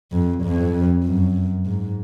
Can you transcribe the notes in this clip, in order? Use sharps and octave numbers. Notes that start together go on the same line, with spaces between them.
F2
F2
F#2
G#2